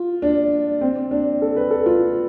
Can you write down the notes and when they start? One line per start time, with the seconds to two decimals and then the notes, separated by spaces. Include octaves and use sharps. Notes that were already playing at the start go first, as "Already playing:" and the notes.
Already playing: F4
0.22 D4
0.81 C4
1.11 D4
1.42 A4
1.56 B4
1.71 A4
1.86 F4